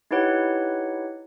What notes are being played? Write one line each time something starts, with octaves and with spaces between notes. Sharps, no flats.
D#4 E4 G4 B4 C#5 F#5